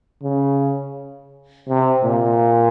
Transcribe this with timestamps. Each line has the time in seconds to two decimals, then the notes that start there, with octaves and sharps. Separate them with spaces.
0.23 C#3
1.69 C3
2.04 A#2